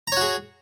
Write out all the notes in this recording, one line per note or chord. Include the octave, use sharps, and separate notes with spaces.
F#4 G#4 C#5 A#5